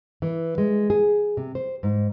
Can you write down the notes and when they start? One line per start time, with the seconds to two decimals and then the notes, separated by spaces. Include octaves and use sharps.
0.22 E3
0.58 G#3
0.90 G#4
1.37 C3
1.55 C5
1.83 G#2